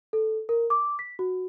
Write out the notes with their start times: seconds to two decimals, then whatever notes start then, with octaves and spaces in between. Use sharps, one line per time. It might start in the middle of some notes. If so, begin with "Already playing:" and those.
0.13 A4
0.49 A#4
0.70 D6
0.99 B6
1.19 F#4